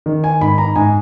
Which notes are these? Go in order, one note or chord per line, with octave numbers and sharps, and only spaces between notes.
D#3
G#5
G#2 B5
A#5
G#2 G#5